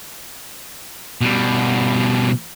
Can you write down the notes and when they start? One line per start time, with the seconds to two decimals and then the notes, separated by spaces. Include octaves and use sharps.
1.21 B2 G3